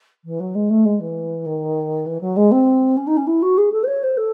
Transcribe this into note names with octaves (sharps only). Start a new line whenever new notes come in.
E3
F#3
G#3
A3
G#3
E3
D#3
E3
F#3
G#3
C4
C#4
D#4
C#4
E4
F#4
G#4
A4
C5
C#5
C5
A4